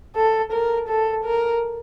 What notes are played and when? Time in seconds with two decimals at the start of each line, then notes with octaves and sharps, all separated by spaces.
0.16 A4
0.53 A#4
0.89 A4
1.25 A#4